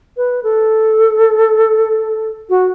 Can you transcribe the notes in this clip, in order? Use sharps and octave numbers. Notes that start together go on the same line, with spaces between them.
B4
A4
F#4